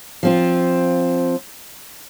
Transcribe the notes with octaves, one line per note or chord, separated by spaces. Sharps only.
F3 C4 F4